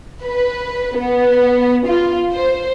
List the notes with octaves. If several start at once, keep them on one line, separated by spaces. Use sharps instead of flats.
B4
B3
F4
C5